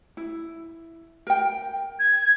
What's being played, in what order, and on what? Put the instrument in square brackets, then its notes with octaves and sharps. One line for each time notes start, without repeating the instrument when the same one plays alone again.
[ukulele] E4
A#4 G5
[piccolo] G#6